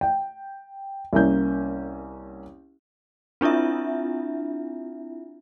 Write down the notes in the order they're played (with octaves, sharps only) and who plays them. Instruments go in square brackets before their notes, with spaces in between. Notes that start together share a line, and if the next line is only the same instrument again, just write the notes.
[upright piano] G5
C2 A#3 C#4 G6
[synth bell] C4 D4 E4 F4 E5